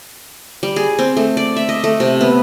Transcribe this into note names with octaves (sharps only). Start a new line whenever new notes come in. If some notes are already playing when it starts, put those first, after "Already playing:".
G3
G#4
C4
A3
D5
E5
D#5
A3
C3
B3